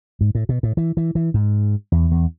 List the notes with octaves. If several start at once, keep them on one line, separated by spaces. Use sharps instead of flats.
G#2
A2
B2
A2
E3
E3
E3
G#2
E2
E2